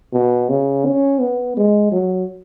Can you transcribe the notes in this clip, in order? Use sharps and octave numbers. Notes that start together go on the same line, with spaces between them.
B2
C#3
C#4
B3
G#3
F#3